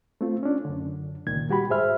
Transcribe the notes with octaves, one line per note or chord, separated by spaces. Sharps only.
A3 C4 F4
C#4 D4
F#2 D3
C#2 A#2 D#3 G#6
G3 F#4 G4 B5
G#2 G#4 C5 E5 F6